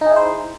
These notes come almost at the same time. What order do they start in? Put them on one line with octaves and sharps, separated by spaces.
D#4 G#4 E4 C5